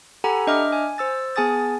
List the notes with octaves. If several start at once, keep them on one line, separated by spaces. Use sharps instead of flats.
G4 A4 F#5 G#5 A#5 B5
D4 D#5 E5 D6 F6
G#5
C5 E6 A6
B3 G#4 G#5 A5 D#6 A6